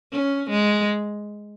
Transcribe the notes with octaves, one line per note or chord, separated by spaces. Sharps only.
C#4
G#3